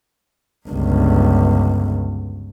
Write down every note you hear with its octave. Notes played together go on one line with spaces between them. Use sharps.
G1 C#2